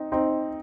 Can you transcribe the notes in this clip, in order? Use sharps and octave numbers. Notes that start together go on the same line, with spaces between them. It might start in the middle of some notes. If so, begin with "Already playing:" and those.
Already playing: C4 D#4
C4 D#4